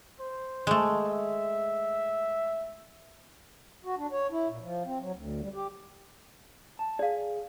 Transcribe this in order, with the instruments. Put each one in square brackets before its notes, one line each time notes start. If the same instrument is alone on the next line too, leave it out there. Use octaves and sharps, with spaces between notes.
[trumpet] C5
[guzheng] G#3 A3
[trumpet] E5
[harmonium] F#4
D4
C#5
E4
A#2
F3
C4
F#3
D2
G3
G4
[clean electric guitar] A5
[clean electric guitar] G#4 [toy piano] D5 F5